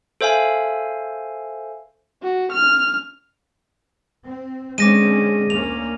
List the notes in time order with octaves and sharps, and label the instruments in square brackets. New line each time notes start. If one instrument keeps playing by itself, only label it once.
[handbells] A4 C5 E5 F5 G#5
[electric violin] F#4
F6
[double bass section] C4
[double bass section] D3 C4 C#4 [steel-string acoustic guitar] G#3 [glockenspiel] D6 A#6 D#7
[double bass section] D2 A#3 C#4 [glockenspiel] F7